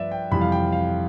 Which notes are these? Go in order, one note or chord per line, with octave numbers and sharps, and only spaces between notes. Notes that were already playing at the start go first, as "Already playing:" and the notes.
Already playing: G2 F3 B4 D5 E5
G5
F2 C3 E3 G3 B5
F5
G5
F5